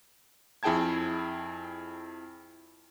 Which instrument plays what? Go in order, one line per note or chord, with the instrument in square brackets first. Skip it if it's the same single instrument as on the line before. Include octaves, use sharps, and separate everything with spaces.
[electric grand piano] F2 E4 G#4 G5 A5 G#6